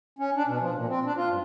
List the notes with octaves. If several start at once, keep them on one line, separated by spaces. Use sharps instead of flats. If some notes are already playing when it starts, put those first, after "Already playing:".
C#4
D4
B2
F3
A#2
C4
D4
F4
G2